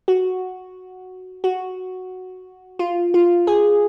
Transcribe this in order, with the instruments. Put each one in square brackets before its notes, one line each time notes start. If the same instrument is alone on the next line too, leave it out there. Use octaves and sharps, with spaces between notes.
[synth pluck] F#4
F#4
F4
F4
G#4